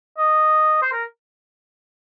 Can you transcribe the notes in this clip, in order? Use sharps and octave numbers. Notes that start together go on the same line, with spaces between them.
D#5
C5
A#4